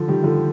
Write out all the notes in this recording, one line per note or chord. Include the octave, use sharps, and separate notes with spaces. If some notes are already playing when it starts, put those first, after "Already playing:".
Already playing: D3 F3
D#3 G3
D3 F3